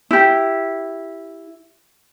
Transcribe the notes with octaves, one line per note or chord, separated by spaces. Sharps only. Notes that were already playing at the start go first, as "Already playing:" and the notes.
E4 G4